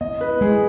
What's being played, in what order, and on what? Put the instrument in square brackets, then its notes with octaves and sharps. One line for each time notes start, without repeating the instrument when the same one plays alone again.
[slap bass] B3 [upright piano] D#5
[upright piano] B4
[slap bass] G#3 [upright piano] G#4